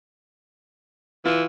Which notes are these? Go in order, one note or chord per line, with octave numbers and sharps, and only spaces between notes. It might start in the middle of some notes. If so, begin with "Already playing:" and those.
E3 F4